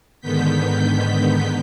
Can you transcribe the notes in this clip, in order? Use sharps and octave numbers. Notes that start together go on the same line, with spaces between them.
G#2 D3 D#3 B3 G6 B6